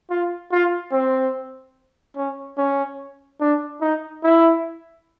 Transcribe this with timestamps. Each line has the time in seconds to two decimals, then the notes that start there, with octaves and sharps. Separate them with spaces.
0.10 F4
0.52 F4
0.92 C4
2.16 C#4
2.58 C#4
3.41 D4
3.81 D#4
4.23 E4